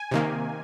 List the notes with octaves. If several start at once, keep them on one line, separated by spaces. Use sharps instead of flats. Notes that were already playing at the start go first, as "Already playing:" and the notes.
Already playing: G#5
C3 D#3 A#3